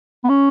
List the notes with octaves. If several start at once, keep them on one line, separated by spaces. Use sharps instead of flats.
B3
C#4